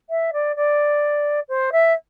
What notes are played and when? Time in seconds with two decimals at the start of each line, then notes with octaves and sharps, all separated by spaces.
0.10 E5
0.33 D5
0.56 D5
1.49 C5
1.72 E5